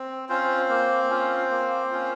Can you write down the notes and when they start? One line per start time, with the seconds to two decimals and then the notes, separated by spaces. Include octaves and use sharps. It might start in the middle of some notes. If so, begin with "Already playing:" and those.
Already playing: C4
0.29 C4 C#4 F4 C5
0.69 A#3
1.10 C#4 F4
1.51 A#3
1.91 C#4 F4